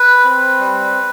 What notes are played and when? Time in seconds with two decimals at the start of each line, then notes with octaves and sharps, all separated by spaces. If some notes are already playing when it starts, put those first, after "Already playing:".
Already playing: B4
0.25 C4
0.59 G3